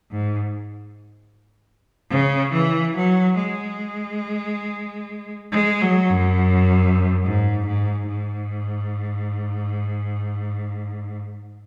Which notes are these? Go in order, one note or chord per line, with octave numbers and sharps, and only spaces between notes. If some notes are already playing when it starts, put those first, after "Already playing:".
G#2
C#3
E3
F#3
G#3
G#3
F#3
F#2
G#2
G#2
G#2